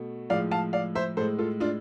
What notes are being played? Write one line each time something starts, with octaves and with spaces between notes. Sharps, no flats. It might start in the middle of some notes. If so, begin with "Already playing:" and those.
Already playing: B2 A3
A2 F3 G#3 D5 F5
F5 A5
D5 F5
C5 E5
A2 G#3 A4 C5
F4 A4
D4 F4